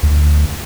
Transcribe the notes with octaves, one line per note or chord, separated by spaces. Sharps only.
D2